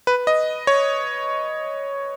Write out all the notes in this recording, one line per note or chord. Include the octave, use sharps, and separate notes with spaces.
B4
D#5
C#5